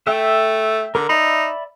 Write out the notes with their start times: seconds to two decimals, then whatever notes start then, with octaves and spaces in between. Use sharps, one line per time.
0.07 A3 E5 G5
0.95 D3 A#4
1.09 D#4 D5 E5 B5